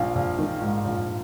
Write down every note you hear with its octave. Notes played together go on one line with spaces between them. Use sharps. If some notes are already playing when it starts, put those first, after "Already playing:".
Already playing: A#1 F5
A#1
D#3
G#2
A#1